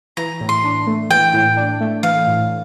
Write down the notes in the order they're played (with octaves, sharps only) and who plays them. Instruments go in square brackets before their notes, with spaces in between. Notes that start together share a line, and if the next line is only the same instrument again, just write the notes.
[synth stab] E3 [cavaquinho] A#5
[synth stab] A2
[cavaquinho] C6
[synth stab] D4
A3
[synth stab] E3 [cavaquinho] G5
[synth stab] A2
D4
A3
[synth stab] E3 [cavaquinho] F5
[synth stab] A2